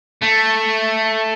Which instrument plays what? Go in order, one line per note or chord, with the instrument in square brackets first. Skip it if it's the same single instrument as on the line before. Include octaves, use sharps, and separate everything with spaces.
[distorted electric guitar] A3